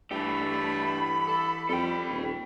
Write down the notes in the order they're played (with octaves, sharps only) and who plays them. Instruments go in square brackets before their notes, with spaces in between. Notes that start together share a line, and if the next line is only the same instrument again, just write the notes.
[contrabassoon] G2 [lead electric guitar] E3 G4 [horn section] A3 [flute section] B5
[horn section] A4
[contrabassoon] F2 [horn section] G3 [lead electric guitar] A4 G5
[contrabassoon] D#1